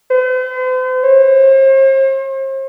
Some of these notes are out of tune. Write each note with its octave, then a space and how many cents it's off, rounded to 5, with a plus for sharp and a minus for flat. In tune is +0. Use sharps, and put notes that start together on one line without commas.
C5 -45
C5 +40